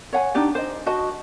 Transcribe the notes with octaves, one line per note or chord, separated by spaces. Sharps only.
C#5 F#5 G#5
D4 D#4 G4 D5
C5 D#5
F#4 D#5 A5